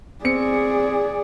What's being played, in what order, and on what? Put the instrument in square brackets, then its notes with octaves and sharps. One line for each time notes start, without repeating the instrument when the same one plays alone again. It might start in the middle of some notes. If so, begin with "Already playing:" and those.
[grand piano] C4 C#7 [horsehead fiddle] G#4 D5